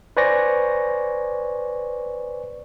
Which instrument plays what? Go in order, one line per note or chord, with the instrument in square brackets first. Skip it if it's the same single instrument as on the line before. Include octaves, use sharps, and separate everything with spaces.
[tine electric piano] B4 C5 D5 G#5 C#6 A#6